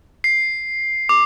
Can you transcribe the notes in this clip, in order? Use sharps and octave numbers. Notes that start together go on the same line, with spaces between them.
C7
D6